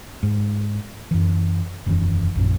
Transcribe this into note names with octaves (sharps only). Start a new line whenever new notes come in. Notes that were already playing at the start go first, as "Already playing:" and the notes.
G#2
F#2 E3
E1 F#2 D#3 E3
A#1 F#2 A#2